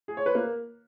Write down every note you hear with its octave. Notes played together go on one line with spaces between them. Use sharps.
G#4
C#5
B4
A#3